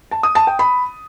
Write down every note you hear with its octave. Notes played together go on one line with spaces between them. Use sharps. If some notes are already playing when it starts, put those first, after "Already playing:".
A5
D#6
A5
G5
B5